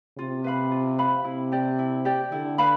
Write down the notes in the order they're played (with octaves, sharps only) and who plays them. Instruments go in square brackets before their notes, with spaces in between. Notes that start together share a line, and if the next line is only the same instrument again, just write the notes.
[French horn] C3 [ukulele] F4
[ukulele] B4 F5 B5
F4
B4 F5 B5
[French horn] C3 [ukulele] E4
[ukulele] G4 D5
E4
G4 D5
[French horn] D3 [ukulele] E4
[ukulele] B4 F5 B5